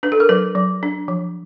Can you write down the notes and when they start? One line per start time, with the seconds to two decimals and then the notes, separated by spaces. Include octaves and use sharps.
0.03 D4 B4
0.12 A4
0.20 A#4
0.29 F#3 B4
0.55 F#3
0.83 D4
1.08 F3